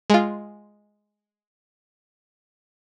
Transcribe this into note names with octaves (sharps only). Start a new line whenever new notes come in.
G#3 F4